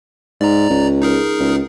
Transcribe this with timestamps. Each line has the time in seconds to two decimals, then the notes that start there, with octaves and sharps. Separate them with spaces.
0.41 G#2 D5 A#5
0.70 C#2
1.02 D#4 G#4 A#4
1.40 C#2